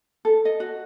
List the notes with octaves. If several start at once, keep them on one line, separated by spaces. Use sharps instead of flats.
A4
D#5
F#4